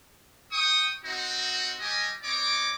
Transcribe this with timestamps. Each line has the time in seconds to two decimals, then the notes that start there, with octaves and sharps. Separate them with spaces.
0.53 G5 C#6 D#6
1.04 C4 D#4 F#4
1.80 G3 G4 D#5 G#5
2.23 C4 C#5 D#5 D6